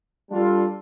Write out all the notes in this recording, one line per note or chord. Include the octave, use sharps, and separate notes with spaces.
G3 D4 F4 A4